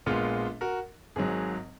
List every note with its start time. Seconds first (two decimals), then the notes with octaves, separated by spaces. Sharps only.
0.06 A#1 A#2 G#3 B3 F4
0.61 F#4 A#4
1.16 G#1 G#2 F#3 G#4